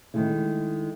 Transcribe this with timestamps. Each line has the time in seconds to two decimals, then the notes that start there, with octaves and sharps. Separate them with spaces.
0.14 D#3 G#3 A3 E4